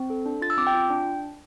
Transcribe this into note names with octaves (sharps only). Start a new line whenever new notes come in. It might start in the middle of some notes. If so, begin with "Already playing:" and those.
Already playing: C4
A4
D4
F4 A6
E6
C4 D6
G5
F4
D4